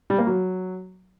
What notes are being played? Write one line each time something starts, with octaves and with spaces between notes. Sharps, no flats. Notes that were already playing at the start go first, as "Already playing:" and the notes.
G3
A#3
F#3